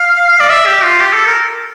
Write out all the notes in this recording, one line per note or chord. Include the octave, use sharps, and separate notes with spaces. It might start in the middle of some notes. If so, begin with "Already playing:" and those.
Already playing: F5
D5
E5
G4
F4
G4
A4
A#4